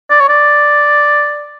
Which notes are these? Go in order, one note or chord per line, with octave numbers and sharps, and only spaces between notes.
D5
C#5
D5